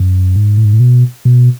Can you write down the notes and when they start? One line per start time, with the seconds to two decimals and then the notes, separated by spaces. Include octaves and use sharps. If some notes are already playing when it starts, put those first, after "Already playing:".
Already playing: F#2
0.36 G#2
0.57 A2
0.65 G#2
0.73 A2
0.80 B2
1.25 B2